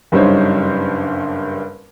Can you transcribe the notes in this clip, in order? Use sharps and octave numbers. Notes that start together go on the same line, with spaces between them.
F#1 G2 G3 D#4 C5 C#5